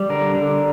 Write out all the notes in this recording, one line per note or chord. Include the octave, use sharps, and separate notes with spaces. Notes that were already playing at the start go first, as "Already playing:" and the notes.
Already playing: G3
D3 A#4
D3